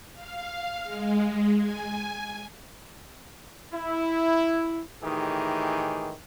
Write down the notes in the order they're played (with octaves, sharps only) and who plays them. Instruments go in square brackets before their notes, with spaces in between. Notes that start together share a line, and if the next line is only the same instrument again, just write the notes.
[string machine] F5
G#3
G#5
[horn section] E4
A2 D#3 E3 D#4 G4 G#4